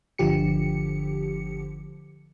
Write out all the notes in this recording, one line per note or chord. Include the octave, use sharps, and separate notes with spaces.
G1 D3 F3 G4 C#7